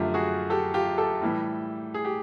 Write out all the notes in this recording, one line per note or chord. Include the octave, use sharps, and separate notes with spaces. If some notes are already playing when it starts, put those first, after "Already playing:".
Already playing: F#2 D3 F3 A3 F4 G4
F#4 G#4
G4 A4
F4 G4
G4 A4
A2 E3 G3
G#4
G4